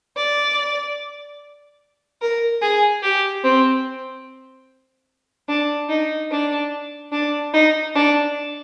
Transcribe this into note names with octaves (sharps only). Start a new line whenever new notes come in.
D5
A#4
G#4
G4
C4
D4
D#4
D4
D4
D#4
D4